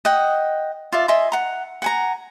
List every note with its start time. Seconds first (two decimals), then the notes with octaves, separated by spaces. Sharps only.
0.05 D#5 F#5 G5
0.92 F4 D5 E5
1.08 D#5 E5 G#5 C6
1.32 F#5 A#5
1.82 F#5 G#5 A#5